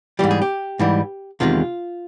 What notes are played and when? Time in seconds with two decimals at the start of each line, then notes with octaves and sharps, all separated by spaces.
0.19 G#2 E3 G3 G4
0.31 G#4
0.42 G4
0.79 G#2 E3 G3
1.40 E2 C3 D#3 G#3 F4